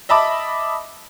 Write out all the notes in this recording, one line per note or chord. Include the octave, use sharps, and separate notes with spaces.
D#5 E5 A5 B5 D6